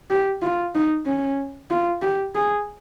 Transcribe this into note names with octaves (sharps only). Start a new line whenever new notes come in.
G4
F4
D#4
C#4
F4
G4
G#4